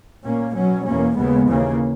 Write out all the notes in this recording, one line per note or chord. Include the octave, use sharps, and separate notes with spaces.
A#2 A#3 C#4
B2 F#3 C#4
E2 B2 A#3 C#4
D#2 C#3 G#3 B3
D#2 C#3 E3 A#3 C#4